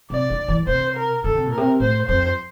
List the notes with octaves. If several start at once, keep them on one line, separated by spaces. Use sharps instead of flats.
C3 D5
D3
E3
C3 C5
A#4
D3 A4
C3
A#2
A#4
C3
A2 C5
F2 C5